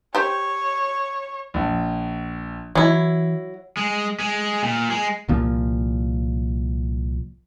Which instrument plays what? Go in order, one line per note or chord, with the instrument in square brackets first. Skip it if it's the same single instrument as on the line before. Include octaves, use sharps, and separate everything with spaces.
[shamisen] G4 C5 [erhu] C#5
[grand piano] A#1
[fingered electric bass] E3 [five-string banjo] F#3 E4
[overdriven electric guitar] G#3
G#3
A#2
G#3
[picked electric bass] C2 A#2 F3